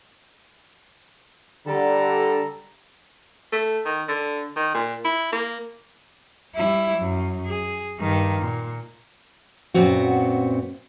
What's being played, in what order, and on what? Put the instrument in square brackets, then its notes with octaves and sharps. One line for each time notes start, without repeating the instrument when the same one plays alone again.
[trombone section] D3 [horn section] G3 A4 A#5
[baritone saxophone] A3
D#3
D3
D#3
A#2
E4
A#3
[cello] G3 E4
F#2
G#4
G2 D#3
A#2
[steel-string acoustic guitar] F#2 A#2 B3 C4 F#4